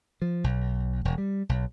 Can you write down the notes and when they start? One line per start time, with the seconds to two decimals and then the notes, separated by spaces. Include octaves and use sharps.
0.22 F3
0.44 B1
1.05 E1
1.18 G3
1.49 B1